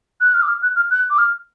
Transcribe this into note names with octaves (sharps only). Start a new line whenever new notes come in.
F#6
F6
D6
F6
F#6
F6
F#6
D6
F6